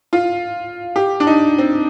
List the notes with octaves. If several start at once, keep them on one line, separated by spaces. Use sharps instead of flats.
F4
G4
D4
D#4
C4